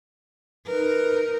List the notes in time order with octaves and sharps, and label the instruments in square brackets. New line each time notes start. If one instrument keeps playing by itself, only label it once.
[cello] D#4 A#4 [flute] B4